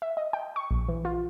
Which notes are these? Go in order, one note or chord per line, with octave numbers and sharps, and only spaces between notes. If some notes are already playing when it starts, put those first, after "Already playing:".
E5
D#5
G5
C#6
A#1
E3
F4